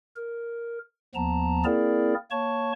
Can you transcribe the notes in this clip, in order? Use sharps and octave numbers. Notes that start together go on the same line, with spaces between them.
A#4
D#2 F3 B3 A5 A#5
A#3 C4 E4 G#4 A#4 D5
A#3 C#5 A5 C#6